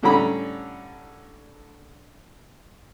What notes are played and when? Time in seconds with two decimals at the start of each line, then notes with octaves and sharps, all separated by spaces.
0.03 A2 D3 G3 C#4 A#5 B5